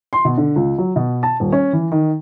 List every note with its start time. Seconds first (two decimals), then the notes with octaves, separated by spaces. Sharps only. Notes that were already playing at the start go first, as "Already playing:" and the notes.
0.13 C6
0.25 B2
0.38 D3
0.56 C#2
0.78 F#3
0.96 B2
1.23 A5
1.40 D#1
1.52 C#4
1.73 E3
1.92 D#3